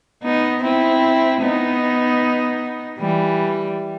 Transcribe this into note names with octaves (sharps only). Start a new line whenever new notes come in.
B3 D#4
C4 E4
B3 D#4
E3 G3